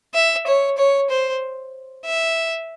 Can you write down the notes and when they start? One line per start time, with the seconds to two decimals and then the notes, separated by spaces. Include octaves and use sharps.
0.14 E5
0.47 C#5
0.78 C#5
1.10 C5
2.05 E5